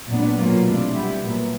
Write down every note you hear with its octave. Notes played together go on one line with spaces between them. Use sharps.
A#2 F#3 B3 D4
B2 F#3 A#3 C#4 F4
C3 E3 A3 D4 F4
G3 B3 E4 G4
A#2 F#3 B3